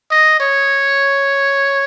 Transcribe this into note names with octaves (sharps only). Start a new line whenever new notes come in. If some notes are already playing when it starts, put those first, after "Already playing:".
D#5
C#5